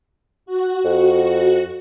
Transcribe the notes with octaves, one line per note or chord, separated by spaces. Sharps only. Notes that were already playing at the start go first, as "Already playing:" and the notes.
F#4
F2